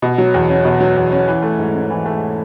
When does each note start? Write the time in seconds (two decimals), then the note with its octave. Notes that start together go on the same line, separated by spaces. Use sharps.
0.02 B2
0.18 F#3
0.34 E2
0.49 C#4
0.65 B2
0.80 F#3
0.96 E2
1.12 C#4
1.28 E3
1.43 A3
1.58 G#2
1.75 C#4
1.90 E3
2.06 A3